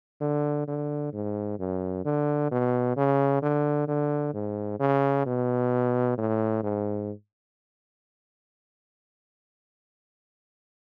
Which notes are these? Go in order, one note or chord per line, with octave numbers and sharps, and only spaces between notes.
D3
D3
G#2
F#2
D3
B2
C#3
D3
D3
G#2
C#3
B2
A2
G#2